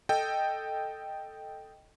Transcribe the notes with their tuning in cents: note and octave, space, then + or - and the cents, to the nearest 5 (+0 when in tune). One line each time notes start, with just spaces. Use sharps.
A4 +0 D#5 +0 G5 +0